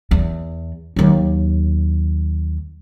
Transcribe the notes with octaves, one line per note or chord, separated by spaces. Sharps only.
E2
D#2 F#3